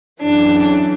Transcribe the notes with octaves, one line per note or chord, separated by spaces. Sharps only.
F#2 C#3 E3 D4